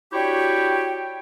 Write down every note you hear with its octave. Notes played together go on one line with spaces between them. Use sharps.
D4 E4 F#4 G4 C#5 G5